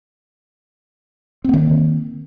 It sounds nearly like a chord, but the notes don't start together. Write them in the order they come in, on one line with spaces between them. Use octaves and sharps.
C4 A#3 D#3